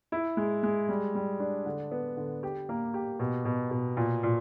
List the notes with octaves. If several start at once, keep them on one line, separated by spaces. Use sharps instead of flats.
E4
G#3
G#3
G3
G3
D4
D3
B3
D3
G4
A#3
G4
B2
B2
B2
A#2
A#2